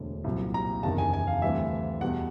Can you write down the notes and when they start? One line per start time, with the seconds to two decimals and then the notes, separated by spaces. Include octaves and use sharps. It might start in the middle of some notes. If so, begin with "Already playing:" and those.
Already playing: E1 D2 D3
0.24 C2 A#2 F#3
0.54 A#5
0.83 F#1 E2 C3 D#3 A5
0.98 G#5
1.13 G#5
1.27 F5
1.42 D2 C3 E3 G3 E5
2.01 E2 B2 G3 F#5